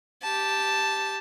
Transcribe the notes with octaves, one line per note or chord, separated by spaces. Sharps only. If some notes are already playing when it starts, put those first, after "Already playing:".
G4 A5